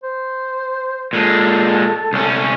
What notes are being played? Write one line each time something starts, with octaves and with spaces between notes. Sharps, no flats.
C5
A#2 G#3 A4
C2 C#4